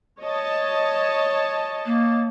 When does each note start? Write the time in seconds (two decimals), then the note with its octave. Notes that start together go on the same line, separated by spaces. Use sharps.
0.20 C#5 D#5 A5
1.86 A#3